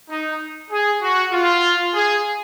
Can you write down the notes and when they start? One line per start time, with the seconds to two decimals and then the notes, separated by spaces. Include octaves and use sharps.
0.10 D#4
0.71 G#4
1.01 F#4
1.32 F4
1.94 G#4